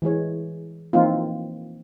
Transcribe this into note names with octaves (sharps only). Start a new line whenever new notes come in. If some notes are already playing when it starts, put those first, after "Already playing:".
E3 G#3 G#4 C#5
E3 F3 A#3 C4 D#4 F4